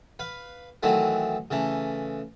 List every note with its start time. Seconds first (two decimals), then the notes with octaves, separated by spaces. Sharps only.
0.19 B4 F5
0.83 D#3 E3 F#3 A3 C4
1.51 C#3 E3 A3